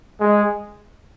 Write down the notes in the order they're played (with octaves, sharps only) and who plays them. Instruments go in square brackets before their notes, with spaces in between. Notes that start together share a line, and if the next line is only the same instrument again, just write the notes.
[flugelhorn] G#3